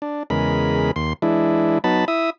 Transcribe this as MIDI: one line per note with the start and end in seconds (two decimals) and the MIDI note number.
0.02 0.23 62
0.30 0.91 40
0.30 0.91 49
0.30 0.91 56
0.30 0.91 70
0.30 0.91 83
0.96 1.13 39
0.96 1.13 84
1.22 1.78 52
1.22 1.78 56
1.22 1.78 62
1.22 1.78 64
1.84 2.05 54
1.84 2.05 59
1.84 2.05 63
1.84 2.05 81
1.84 2.05 83
2.08 2.30 64
2.08 2.30 76
2.08 2.30 87